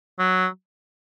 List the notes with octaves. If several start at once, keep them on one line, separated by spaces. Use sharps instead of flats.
F#3